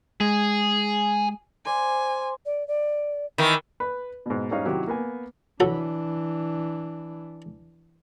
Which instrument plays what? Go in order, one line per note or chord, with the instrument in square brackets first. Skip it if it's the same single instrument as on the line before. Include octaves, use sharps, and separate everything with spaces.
[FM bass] G#3 [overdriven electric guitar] G#4
[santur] C5 D5 C6 [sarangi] G#5
[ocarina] D5
D5
[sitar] D#3 E3
[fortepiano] B4 B5
G#2 B2
G#2 G3 C#4 D#4 F5
C3 D#3 F#3 E4 G4
A#3 B3 G#5
[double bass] E3 D4 [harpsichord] F#3 F#4 A4